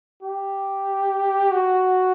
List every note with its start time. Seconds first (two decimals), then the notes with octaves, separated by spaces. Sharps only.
0.23 G4
1.52 F#4